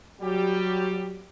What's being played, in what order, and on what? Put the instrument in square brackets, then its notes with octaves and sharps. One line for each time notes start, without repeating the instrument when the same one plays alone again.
[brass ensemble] F#3 G3 G4